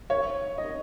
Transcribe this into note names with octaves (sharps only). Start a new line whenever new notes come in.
C#5
D#5